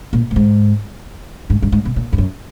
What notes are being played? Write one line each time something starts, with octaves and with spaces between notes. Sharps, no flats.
A#2
A2
G#2
G#2
G2
G#2
B2
A#2
F2
F#2